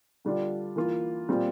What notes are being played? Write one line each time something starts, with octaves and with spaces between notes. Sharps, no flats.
D3 G3 D4 F4
E3 A#3 F4
A#2 G3 C4 F4